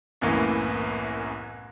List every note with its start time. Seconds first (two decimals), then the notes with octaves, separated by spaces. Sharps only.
0.21 C2 F#2 A2 E3 A#3 B3